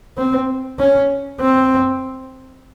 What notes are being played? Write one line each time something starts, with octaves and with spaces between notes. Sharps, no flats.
C4
C#4
C4